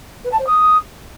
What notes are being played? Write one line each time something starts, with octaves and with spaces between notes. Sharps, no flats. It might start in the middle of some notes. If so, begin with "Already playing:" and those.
B4
A5
C5
D#6